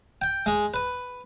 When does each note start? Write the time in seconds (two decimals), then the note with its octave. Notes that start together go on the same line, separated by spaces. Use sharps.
0.22 G5
0.46 G#3
0.74 B4